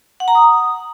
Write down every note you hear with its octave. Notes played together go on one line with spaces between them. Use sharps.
F#5
A#5
D#6